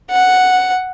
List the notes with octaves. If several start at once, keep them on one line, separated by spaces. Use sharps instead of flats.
F#5